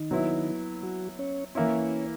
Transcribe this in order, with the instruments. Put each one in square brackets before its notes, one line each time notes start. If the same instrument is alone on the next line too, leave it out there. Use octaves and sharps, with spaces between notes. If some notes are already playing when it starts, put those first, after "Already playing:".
Already playing: [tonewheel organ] D#3 D#4
[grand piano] F#3 B3 E4
[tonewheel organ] F#3 F#4
C#4 C#5
[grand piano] E3 A#3 E4 [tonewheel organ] C#4 C#5